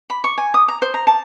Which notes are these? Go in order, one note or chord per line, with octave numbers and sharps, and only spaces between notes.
B5
C#6
G#5
D#6
A#5
C5
A#5
A5